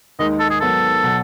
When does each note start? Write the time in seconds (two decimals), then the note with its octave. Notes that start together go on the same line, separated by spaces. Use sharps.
0.19 D#2 D#3 G#3 D#4 D#5
0.40 A4
0.50 G#4
0.61 G#2 D#3 F#3 B3 A4
1.02 B2 F#3